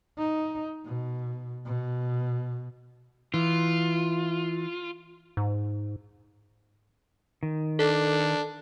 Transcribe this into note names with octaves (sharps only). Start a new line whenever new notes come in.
D#4
B2
B2
E3 F4
G#2
D#3
D4 A4